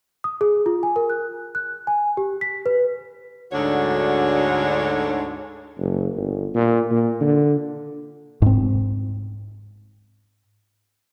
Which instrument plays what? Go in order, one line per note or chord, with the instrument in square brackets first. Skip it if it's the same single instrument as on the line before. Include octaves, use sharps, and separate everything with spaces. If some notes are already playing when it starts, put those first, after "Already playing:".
[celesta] D#6
G#4
F4
G#5
A#4
F#6
F#6
G#5
G4
B6
B4
[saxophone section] D2 G#2 D3 D4 F#4 C#5
[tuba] F#1
G1
A#2
A#2
D3
[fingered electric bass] G#2 C4